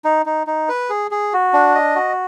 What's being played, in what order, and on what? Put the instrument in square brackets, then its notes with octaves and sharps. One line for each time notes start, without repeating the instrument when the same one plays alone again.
[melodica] D#4
D#4
D#4
B4
G#4
G#4
F#4
D4
D#5
F#4